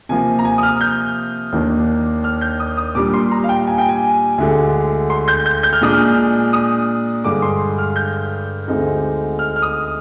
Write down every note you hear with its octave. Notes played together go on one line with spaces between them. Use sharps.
C3 F3 A#3 G#5
A#5
G#5
D#6
F6
G6
D#2 D#3 A#3 D4
F6
G6
D#6
D#6
A#2 G3 D4 D6
C6
A#5
F5
G5
G#5
G5
G#5
D2 D3 G#3
C6
G6
G6
G6
F6
A#2 G#3 D4 D#6
F6
D#6
G2 D3 G#3 D6
C6
F6
G6
D2 D3 G#3 C4 D#4
F6
F6
D#6